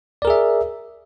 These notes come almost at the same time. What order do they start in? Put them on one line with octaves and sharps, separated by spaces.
D5 A#4 G#4 E5